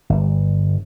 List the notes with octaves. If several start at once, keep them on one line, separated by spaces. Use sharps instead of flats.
G1